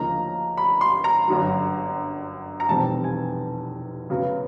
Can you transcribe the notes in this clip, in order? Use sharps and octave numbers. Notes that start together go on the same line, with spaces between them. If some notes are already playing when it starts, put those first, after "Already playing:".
Already playing: D2 C#3 F3 A#3 D#4 A#5
B5
C6
A#5
G1 F#2 D3 F#3
A#5
F1 E2 B2 G3 C4 A5
G#5
F#2 C#3 F#3 B3